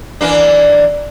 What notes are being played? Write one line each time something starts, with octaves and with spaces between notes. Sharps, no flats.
E3 A#3 D4